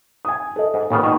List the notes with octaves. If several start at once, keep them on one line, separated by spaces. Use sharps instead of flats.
G#5 D#6
A4 D#5
G#2
D#2 A#2 C#3 B3
B2 D#3 D#4